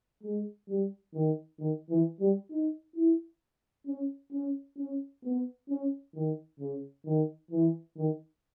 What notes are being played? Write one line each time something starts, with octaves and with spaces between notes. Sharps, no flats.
G#3
G3
D#3
D#3
E3
G3
D#4
E4
C#4
C#4
C#4
B3
C#4
D#3
C#3
D#3
E3
D#3